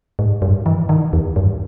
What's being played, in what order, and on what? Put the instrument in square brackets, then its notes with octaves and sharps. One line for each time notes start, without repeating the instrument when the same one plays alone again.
[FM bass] G#2
G2
E3
D#3
E2
G2